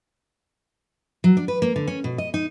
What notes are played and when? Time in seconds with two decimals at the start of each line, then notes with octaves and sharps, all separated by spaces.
1.24 F#3
1.37 D4
1.48 B4
1.62 A#3
1.76 D3
1.88 C#4
2.04 B2
2.18 D#5
2.34 D#4